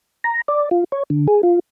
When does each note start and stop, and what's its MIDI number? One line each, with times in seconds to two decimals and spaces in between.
0.24 0.41 82
0.48 0.69 74
0.71 0.84 65
0.92 1.03 73
1.10 1.27 50
1.28 1.42 68
1.43 1.59 65